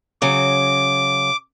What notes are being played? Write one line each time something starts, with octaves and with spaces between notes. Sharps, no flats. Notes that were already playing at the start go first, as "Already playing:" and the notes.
C#3 F#3 D6